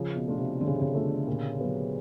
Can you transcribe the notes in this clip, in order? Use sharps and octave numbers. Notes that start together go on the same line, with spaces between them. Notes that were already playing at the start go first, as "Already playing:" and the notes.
Already playing: C#3 F3
B2
A3 D4 F4
C3
D3 F3
C#3
C3
C#3
A3 D4 F4
A#2
F#3 B3